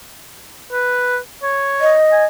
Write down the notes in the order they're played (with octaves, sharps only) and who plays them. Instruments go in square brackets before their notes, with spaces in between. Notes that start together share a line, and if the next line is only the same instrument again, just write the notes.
[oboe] B4
C#5
[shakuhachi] D#5
[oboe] G#5